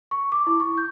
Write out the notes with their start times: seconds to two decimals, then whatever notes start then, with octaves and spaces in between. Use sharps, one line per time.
0.11 C#6
0.32 D6
0.47 E4
0.60 C#6
0.78 G6